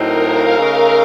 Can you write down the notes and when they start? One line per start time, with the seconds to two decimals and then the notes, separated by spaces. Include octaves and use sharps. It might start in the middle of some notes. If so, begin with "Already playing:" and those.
Already playing: A2 F#3 C4 D#4 A#4
0.26 F5
0.59 C#3 A3 D#4 A#4 C#5